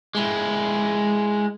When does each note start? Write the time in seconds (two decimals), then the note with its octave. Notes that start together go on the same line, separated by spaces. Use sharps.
0.15 G#3 E4